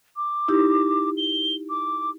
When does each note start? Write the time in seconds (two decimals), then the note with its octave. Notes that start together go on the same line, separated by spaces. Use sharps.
0.16 D6
0.48 D#4 E4 G4
1.17 G7
1.69 D6